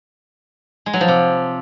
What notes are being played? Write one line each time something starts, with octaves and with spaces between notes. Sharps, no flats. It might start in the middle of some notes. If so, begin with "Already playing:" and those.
G#3
F#3
F3
C3